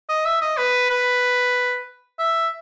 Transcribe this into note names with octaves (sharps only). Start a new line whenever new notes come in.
D#5
E5
D#5
B4
B4
E5